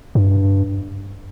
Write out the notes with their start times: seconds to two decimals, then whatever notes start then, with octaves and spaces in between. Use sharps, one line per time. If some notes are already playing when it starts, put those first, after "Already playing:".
0.15 G2